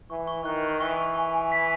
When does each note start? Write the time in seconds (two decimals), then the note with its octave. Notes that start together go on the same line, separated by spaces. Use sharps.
0.10 E3 C#6
0.27 C#6
0.45 D#3 F#6
0.63 F#6
0.81 E3 C#6
0.98 C#6
1.16 G#5
1.34 G#5
1.52 B6